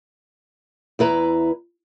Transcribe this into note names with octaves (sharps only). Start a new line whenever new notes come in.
E2 E4 B4 A#5